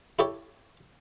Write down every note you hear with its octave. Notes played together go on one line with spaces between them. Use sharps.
E4 G4 A4 C#5